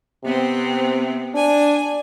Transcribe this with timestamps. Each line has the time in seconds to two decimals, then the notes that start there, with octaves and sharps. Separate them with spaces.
0.24 C3 B3 C4
1.35 D4 G#5